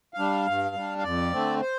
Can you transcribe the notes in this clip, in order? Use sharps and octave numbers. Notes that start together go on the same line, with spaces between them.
G3 D4 F5
G2
G3 D4
F5
F2 D5
D3 A3 C4
C5